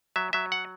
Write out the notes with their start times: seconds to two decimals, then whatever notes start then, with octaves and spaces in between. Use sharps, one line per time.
0.16 F#3 E5
0.33 F#3 E5
0.52 F#5